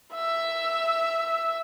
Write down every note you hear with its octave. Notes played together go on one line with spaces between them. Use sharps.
E5 E6